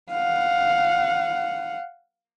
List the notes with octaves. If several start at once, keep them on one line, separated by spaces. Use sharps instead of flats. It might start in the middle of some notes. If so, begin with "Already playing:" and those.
F5 F#5